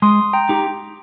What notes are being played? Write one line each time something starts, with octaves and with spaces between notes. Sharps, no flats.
G#3 C6 D#6
G5 A#5
D#4 G4